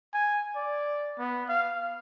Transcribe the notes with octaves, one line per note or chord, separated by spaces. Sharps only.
G#5
D5
B3
F5